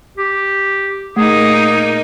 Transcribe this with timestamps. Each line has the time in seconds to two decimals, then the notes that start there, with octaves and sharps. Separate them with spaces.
0.17 G4
1.16 A#2 A3 A#3 D#4 G#4